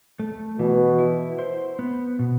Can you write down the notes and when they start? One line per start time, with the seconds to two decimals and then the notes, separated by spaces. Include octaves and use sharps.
0.19 A3
0.59 B2 E3
0.99 E4
1.39 C5
1.79 B3
2.19 B2